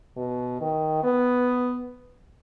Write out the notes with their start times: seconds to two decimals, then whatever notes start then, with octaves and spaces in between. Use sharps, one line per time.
0.17 B2
0.60 D#3
1.04 B3